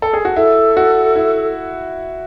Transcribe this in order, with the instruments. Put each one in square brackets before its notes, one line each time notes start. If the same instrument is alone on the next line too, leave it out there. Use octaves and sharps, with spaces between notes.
[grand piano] A4
G#4
F#4
[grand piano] E4 [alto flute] A4
[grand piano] F#4
E4